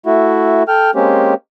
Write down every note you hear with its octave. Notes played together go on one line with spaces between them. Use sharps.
A3 E4 F#4
A4 G5 F6
G#3 A#3 C4 C#4 G4